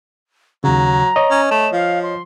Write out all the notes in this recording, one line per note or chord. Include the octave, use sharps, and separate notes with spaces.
D#2 C#3 F#3 A#5
C#5 D#5
C#4
A3 E7
F3 F5
C6